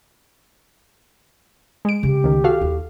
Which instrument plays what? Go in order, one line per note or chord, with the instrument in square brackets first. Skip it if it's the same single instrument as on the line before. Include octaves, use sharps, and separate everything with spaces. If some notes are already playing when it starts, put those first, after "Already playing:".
[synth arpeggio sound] G#3 D7
[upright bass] C#3 A3 [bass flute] G4
[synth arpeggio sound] C#2 D#3
F#4 A4 F5
[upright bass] D#2 E4